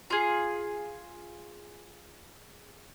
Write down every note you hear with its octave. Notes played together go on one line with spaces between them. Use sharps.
F4 G#4